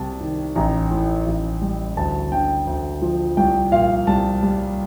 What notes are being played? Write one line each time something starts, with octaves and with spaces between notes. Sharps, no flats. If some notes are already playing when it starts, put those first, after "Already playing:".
Already playing: C2 C3 G3 A5
D#3
A1 A#5
A2
A1
G3
D2 A5
D3 G5
D2
F3
C2 G5
A#2 F5
C2 A5
G3